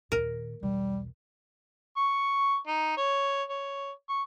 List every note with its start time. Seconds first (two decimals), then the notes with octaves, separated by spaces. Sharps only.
0.12 D#2 A#2 A#4
0.63 B1 E2 G3
1.97 C#6
2.67 D#4
2.97 C#5
3.49 C#5
4.09 C#6